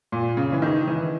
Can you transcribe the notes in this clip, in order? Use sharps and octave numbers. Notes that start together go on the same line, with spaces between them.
A#2
C#3
E3
D#3
E3